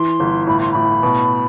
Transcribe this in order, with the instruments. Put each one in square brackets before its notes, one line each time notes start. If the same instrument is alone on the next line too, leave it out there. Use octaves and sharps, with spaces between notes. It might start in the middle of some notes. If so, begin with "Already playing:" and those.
Already playing: [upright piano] E3 [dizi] C6
[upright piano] G1
[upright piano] A2 [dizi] B5
[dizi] C6
[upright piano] A2 [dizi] B5
[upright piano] B2